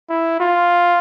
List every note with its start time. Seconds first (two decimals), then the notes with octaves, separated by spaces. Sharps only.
0.10 E4
0.40 F4